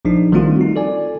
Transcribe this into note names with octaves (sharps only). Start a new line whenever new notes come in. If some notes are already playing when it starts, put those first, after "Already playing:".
A#1 F3 D4 D#4
D#3 G3 A3 C4 F4 F#4
D#4
A4 D5 G#5